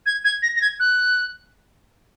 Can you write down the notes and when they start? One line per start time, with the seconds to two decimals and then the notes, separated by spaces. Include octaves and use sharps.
0.06 G#6
0.24 G#6
0.42 A#6
0.56 A#6
0.62 G#6
0.80 F#6